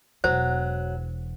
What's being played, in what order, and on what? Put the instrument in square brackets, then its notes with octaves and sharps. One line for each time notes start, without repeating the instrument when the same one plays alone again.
[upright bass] E1 E2 [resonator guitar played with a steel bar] F#3 [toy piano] C5